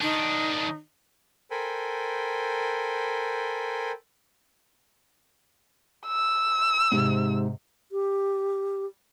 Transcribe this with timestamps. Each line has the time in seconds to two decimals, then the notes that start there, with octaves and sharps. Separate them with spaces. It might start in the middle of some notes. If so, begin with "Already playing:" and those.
0.01 D#3 D4 D#4
1.51 A4 A#4 C5 G5 G#5 B5
6.07 E6
6.92 G#2 C3
7.92 G4